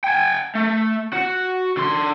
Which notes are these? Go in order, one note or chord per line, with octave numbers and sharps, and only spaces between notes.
G5 G#5
A3
F#4
D3 C6